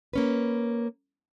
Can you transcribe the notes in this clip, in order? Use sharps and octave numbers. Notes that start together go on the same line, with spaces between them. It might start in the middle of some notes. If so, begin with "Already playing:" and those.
A#3 C#4 B4